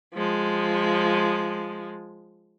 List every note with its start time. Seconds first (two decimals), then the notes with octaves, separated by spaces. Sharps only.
0.15 F3 G#3